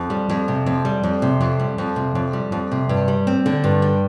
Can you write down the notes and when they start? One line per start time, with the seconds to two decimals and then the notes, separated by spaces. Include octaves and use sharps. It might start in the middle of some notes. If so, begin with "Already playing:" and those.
Already playing: F2
0.10 G3
0.29 F2
0.48 C3
0.66 F2
0.85 G3
1.03 F2
1.22 C3
1.41 F2
1.59 G3
1.78 F2
1.96 C3
2.15 F2
2.33 G3
2.52 F2
2.72 C3
2.89 G2
3.08 G3
3.27 C4
3.46 D3
3.64 G2
3.82 G3